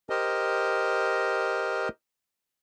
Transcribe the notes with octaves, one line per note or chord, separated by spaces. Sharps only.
G4 A#4 C5 D#5